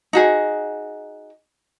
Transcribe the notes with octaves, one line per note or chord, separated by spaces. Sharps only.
D#4 F#4 G#4